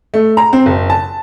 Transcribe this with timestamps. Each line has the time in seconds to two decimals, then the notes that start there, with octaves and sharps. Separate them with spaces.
0.14 A3
0.37 A#5
0.53 C4
0.66 F#1
0.90 A5